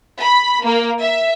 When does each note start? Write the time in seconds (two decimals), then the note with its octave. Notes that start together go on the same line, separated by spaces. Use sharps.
0.20 B5
0.65 A#3
1.01 E5